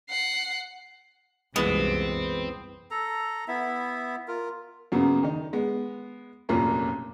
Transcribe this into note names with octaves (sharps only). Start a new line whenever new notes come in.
F#5 C7
C2 F#2 A#2 E3 G#3 B3 C4
A4 A#5
B3 E4 E5
F4 A#4
F#2 C#3 F#3 A#3 B3
D#3 D#4
G#3 B3
F1 F#2 A#2 A#3 C#4 A#4